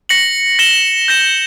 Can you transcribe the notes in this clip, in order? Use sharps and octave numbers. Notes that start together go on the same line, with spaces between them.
A#6 C#7 F#7
A#6 E7 G7
G6 A#6 E7